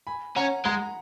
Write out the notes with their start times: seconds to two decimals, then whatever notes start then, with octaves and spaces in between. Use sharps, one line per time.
0.07 G#5 B5
0.36 C#4 F#5 A#5
0.65 G#3 F#5 A#5